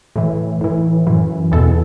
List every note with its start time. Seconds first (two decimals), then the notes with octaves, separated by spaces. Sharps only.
0.16 A2 E3
0.61 A2 E3
1.07 F#2 E3
1.52 E2 B2 A4